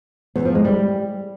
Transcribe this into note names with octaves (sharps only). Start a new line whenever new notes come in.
E2
F3
G#3
G3